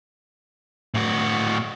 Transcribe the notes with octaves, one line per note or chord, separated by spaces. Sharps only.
A2 F#4